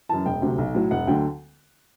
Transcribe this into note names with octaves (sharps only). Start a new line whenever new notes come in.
F#2 E3 A5
E1 G5
D2 C3 F#3
B1
A2 F#3
E1 F#5
D2 D3 F#3 G5